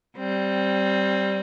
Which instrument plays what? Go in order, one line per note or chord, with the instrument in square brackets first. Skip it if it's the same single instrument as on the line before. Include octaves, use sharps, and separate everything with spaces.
[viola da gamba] G3 [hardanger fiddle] C4